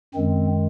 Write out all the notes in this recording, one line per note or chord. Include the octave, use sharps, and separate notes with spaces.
F#2 D#3 G#3 C4